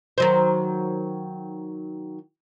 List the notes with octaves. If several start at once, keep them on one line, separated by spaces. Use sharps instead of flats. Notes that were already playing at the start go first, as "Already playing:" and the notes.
D#3 F#3 C5